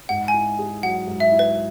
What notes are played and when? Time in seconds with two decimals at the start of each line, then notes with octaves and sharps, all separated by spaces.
0.09 G#2 F#5
0.28 G#5
0.34 E4
0.59 G#4
0.83 F#3 F#5
1.07 G#2
1.20 E5
1.32 E4
1.39 B4